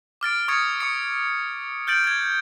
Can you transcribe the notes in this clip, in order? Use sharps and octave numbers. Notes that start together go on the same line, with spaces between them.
D6 F6 A6 D7
C#6 D#6 F6 G#6 A6 C#7
C#6 D#6 C#7
F6 G6 A6 D7 F#7
G#6 A6